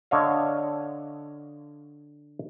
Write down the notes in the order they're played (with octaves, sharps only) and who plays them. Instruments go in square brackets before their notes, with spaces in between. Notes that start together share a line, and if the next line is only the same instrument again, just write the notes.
[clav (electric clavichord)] D3 C#5 D#5 F5